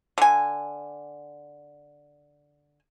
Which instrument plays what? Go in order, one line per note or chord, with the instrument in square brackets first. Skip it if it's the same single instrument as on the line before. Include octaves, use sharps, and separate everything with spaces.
[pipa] D3 G#5